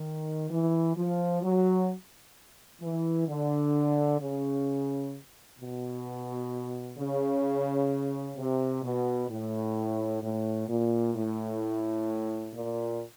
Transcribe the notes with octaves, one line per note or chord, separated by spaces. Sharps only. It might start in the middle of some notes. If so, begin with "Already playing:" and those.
Already playing: D#3
E3
F3
F#3
E3
D3
C#3
B2
C#3
C3
B2
A2
A2
A#2
A2
A#2